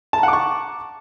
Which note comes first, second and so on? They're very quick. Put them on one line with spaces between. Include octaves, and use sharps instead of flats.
A5 A#5 F#5 D6 C#6